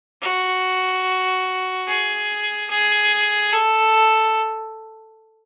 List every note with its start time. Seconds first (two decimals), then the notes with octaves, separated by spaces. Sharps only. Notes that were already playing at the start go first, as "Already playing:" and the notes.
0.22 F#4
1.88 G#4
2.70 G#4
3.53 A4